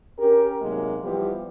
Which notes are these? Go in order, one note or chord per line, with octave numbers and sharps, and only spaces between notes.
C#4 G4 A#4
G#2 C3 F#3 G#3 A#3
E3 F3 G3 B3 G4